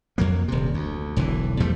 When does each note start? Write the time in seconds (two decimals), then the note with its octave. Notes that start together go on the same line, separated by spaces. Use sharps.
0.18 F2 F#3 A#3
0.48 D#1 C3
0.74 D2
1.17 E1 B1 D3 E3
1.60 E2 F3 G3 A3